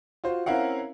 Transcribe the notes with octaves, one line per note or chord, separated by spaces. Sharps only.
F4 F#4 C5
C4 C#4 E4 A#4 F5 F#5